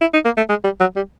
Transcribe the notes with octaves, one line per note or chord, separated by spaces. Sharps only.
E4
D#4
A#3
A3
G#3
G3
F#3
G3